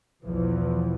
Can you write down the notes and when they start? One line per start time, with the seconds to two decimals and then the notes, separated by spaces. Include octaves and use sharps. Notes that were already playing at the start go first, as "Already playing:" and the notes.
0.24 B1 E2 B2 E3 F3